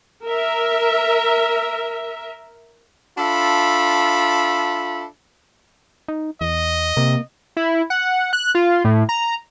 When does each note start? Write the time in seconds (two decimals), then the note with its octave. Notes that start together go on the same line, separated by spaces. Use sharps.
0.24 A#4 E5
3.18 D4 F4 A4 E5 B5
6.08 D#4
6.41 E2 D#5
6.97 C3 A#3
7.57 E4
7.90 F#5
8.33 F#6
8.55 F4
8.85 A2
9.09 A#5